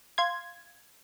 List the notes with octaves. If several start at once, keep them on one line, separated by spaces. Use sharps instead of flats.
F5 C6 G#6